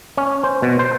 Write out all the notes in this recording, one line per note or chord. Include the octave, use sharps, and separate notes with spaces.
C#4
C5
B2
C5